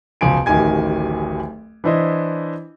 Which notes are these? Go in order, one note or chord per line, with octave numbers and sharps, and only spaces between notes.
E1 C#2 F3 G#5 D7
D1 A1 D#3 G4 G#5 G#6
E3 D4 E4 C5 D#5